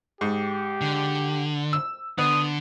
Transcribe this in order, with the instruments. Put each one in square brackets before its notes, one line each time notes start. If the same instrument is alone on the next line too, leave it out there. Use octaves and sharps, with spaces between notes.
[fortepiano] G#2 [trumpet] G4
[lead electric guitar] D3
[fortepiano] E6
[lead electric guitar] D3 [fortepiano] B3 [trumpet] D#6